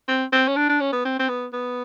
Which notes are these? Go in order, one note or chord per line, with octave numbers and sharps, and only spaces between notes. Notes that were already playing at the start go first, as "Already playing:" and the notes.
C4
C4
C#4
D4
D4
C#4
B3
C4
C4
B3
B3